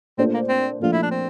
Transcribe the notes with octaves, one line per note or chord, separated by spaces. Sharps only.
A#2 A3 C4 D4 F4 C5
A#3
C4
A#2 F3 A3 D4 F4
E4
D4
C4